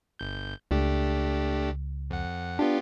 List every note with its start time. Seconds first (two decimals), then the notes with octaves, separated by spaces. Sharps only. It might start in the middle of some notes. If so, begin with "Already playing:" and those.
0.19 G1 G6
0.71 C#2 A3 D4 G4
2.10 F2 F#5
2.59 B3 D4 F4 G4